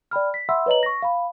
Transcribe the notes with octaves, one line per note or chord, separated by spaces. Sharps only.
D5 G5 B5 F6
B6
E5 F#5 B5 C6 E6
B4 C#5 D#5 A#5 F#7
C#6 A#6
F5 B5